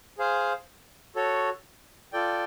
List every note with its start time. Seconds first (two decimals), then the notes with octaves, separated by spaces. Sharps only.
0.18 G#4 C5 F5
1.16 F#4 A4 C#5
2.13 F4 A4 D5 G5